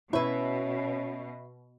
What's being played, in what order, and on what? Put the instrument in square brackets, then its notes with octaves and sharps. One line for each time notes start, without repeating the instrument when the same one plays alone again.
[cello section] B2 [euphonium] C#4 [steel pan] E4 C#5 [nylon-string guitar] B4 E5